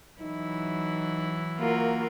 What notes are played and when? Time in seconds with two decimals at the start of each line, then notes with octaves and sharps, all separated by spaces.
0.21 E3 F#3 D#4 E4
1.59 A#3 F4 F#4 A#4